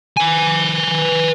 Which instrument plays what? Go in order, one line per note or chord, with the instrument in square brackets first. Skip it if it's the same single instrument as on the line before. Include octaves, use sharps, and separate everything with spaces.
[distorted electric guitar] B4 G#5